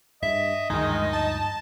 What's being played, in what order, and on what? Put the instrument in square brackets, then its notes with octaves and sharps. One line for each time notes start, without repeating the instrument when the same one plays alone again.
[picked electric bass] G2 [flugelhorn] D#5 [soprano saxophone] E5
[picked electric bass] D2 G2 F3 [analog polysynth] D#3 G#3 [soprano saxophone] D#4
[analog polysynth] A5